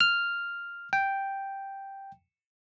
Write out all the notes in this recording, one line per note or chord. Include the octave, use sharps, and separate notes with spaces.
F6
G5